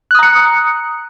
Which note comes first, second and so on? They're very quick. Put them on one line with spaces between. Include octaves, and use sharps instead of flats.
F#6 D#6 A#5 C#7